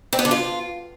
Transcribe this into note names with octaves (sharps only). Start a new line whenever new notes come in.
C4
B3
D3
F4